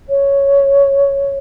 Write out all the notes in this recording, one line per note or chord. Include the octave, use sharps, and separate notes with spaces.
C#5